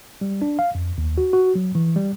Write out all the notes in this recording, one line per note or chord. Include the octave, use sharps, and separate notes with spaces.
G3
D4
F5
F2
D#2
F#4
F#4
F#3
E3
G3